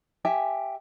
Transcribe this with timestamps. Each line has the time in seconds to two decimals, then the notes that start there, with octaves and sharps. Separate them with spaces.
0.25 G4 E5 G#5